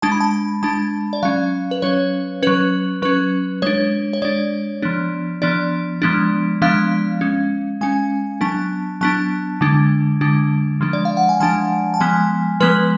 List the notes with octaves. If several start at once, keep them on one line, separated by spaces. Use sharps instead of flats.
G#3 D4 A5
B5
A5
G#3 D4 A5
D5
F#3 C#4 F5
B4
F#3 C#4 C#5
F#3 C#4 B4
F#3 C#4 B4
G#3 D4 C#5
C#5
G#3 D4 D5
F3 B3 D4
F3 B3 D4 D5
F3 G#3 B3 D4
F3 G#3 B3 D4 F5
G#3 C#4
G#3 C#4 G#5
F#3 B3 D4 A5
F#3 B3 D4 A5
D3 G#3 D4
D3 G#3 D4
F3 G#3 D4
D5
F5
F#5
G#5
F3 G#3 D4 A5
A5
F3 G#3 B3 G#5
F3 G#3 B3 B4